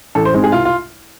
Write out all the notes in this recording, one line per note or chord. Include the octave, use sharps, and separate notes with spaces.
A1 A4
C5
G#2 G#3 C4
G#4
C2 F4
F4